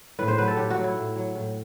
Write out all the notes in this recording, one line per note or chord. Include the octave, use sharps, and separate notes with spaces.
A2 B4
C5
F#3 B4
A4
A2 G4
F#4
F#3
E4
A2
F#3
A2